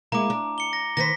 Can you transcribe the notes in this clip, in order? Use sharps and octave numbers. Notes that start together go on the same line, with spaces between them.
G#3 A#3 E4 A#5 D6
D4
C#7 G7
A#6
D#3 B4 C5 A#6 B6